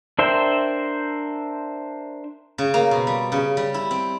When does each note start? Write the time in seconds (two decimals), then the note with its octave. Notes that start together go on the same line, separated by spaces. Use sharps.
0.19 D4 A#4 C5 E5 G5
2.58 C#3
2.74 A#3
2.91 B2
3.07 G3
3.32 C#3
3.57 G3
3.74 E4
3.91 C4